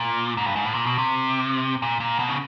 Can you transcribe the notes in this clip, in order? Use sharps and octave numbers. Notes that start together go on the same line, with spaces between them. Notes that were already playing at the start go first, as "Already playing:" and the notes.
Already playing: A#2
G#2
G2
G#2
A2
A#2
B2
C3
A#2
A#2
B2
C#3